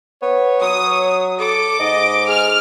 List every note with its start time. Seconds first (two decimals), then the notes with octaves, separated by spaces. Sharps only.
0.22 B3 C#5
0.61 F#3 D#6
1.40 A4 D6
1.80 G#2 D#5
2.28 G#4 F6